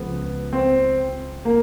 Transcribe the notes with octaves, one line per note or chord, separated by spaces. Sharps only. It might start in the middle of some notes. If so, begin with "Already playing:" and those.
Already playing: C#2 C#3 F3 B3
C4
A#3